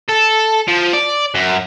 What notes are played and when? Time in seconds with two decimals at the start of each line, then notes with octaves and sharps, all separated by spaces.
0.09 A4
0.68 F3
0.93 D5
1.35 F#2